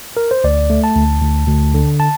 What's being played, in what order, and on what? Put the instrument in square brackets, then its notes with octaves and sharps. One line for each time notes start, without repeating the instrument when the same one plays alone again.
[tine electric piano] A#4
C5
D2 D5
A3
A5
D2
D2
D2
D3
A5